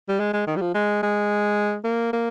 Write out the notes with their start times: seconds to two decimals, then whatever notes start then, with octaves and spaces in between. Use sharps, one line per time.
0.09 G3
0.20 G#3
0.34 G#3
0.47 D#3
0.56 G3
0.61 F3
0.75 G#3
1.03 G#3
1.84 A#3
2.13 A#3